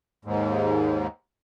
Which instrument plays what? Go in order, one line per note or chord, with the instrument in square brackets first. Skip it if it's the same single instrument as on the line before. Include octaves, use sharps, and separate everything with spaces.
[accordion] D#2 G#2